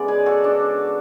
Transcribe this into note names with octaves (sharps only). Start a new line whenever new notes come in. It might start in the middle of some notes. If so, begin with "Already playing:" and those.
Already playing: C#3 G#3 B3 D5
G#4 B4
F#4 A4
D4